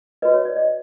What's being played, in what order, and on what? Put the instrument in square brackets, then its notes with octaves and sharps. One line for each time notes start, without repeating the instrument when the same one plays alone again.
[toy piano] F#4 B4 D#5
C#5
D5
D#5